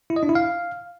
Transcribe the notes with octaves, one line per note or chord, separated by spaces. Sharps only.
E4
D#5
D4
E4
F5